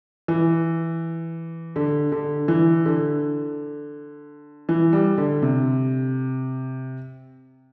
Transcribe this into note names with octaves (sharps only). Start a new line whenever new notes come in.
E3
D3
D3
E3
D3
E3
G3
D3
C3